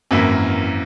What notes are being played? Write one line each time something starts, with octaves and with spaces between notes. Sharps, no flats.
G#1 F#2 E3 A#3 E4